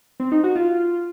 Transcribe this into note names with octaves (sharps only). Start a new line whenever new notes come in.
C4
D#4
F#4
F4